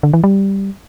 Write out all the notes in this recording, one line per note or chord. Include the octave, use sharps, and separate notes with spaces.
D3
E3
G3